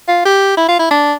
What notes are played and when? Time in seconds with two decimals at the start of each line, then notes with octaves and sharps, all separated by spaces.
0.08 F4
0.25 G4
0.57 E4
0.68 F4
0.79 E4
0.91 D4